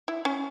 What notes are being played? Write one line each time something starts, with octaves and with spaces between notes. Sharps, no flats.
E4
C#4